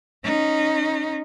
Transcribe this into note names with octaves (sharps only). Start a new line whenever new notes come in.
C#4 D#4